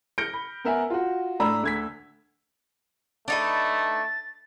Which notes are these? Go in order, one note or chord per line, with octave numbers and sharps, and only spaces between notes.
F6 G6 A#6 C#7 D7
B5
B3 A#4 E5 F#5 G#5
F4 F#4
A2 D4 A#5 B5 E6
D2 G#6 B6
A3 D4 D#4 B4 A6